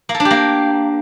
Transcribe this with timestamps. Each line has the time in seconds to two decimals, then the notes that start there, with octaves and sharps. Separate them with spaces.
0.09 A#3
0.14 A4
0.20 D4
0.25 G4
0.31 A#3